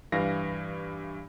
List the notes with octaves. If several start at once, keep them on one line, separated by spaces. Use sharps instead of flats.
G2 E3 F5 A#6